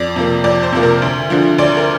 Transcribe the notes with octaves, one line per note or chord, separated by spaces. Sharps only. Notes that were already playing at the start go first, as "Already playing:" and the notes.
Already playing: F2 D5
C3 F3 A#3
F2 D5
C5
C3 F3 A#3
A#4
D2
D3 F3
D2 D5
A#4